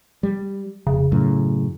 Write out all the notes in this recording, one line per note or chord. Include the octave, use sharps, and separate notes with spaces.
G3
F1 C#3
F#2 A2